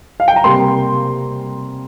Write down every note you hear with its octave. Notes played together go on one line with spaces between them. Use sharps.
F5
G5
A#5
C3 G3 A#3 C6